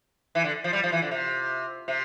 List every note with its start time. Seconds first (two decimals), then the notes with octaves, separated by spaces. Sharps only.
0.35 E3
0.44 D3
0.64 F3
0.73 G3
0.83 F3
0.92 E3
1.02 D3
1.11 C3
1.88 C3